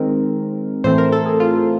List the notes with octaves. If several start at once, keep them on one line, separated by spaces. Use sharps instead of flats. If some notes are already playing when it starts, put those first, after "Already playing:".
Already playing: D#3 G#3 C4 A#4
A2 E3 A3 C4 C5
A#4
A4
G#4
F4